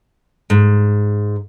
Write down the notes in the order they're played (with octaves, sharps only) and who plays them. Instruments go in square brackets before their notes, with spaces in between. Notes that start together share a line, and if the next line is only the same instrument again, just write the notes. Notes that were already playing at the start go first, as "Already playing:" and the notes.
[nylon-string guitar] G#2